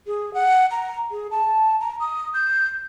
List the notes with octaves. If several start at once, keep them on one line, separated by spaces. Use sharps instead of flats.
G#4
F#5
A#5
G#4
A5
A#5
D#6
G6